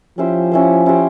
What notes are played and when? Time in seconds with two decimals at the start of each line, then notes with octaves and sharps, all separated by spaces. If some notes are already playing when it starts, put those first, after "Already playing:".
0.18 F3 C#4 E4 G4 C5
0.52 C#4 E4 G4 C5
0.86 C#4 E4 G4 C5